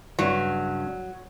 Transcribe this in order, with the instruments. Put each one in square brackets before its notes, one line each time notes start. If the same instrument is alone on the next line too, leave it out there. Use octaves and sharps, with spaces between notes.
[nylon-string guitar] G2 C#3 [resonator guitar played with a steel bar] F#3